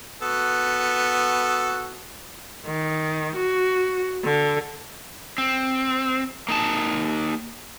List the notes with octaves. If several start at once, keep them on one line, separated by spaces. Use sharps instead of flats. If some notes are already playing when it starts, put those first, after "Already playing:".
B3 F#4 A4
D#3
F#4
D3
C4
A#3 D#4 A5